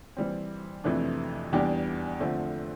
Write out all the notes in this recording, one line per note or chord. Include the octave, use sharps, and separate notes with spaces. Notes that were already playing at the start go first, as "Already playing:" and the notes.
E3 G3 C4
F2 C3 E3 A3 D4
E2 E3 G3 D4 G4
D3 F3 A3 C4